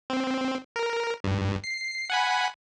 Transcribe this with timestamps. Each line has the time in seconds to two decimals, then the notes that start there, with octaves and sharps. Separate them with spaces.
0.10 C4
0.76 A#4
1.24 G2
1.64 C7
2.10 F#5 G#5 B5